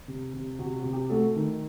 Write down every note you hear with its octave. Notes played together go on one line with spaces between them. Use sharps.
C3
C3
C3 F#4
F#4
C3
G4
A3 F#4 A4
D#3